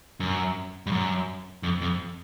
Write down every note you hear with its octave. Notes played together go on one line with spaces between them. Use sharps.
F#2
G2
F#2
F2
F2